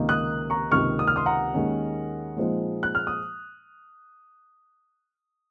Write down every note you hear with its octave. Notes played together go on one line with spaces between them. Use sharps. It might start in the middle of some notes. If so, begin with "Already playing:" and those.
Already playing: C#2 C3 D#3 A#3 D#4
D#6 F#6
A#5 C#6
C#2 C3 D#3 A#3 C#6 F6
D#6
F6
C6 D#6
F#5 A#5
D#2 D#3 G#3 C#4
A#2 F3 G#3 C4 D#4
F#6
F6
D#6